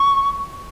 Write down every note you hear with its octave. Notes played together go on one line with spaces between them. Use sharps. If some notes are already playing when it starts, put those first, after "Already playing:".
Already playing: C#6